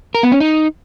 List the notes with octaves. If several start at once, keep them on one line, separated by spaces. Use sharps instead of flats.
A#4
B3
C#4
D#4